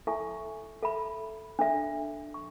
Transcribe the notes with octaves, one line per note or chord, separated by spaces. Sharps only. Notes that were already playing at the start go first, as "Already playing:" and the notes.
E4 A4 E5 G#5 C#6
A4 E5 B5
D4 A4 E5
C#6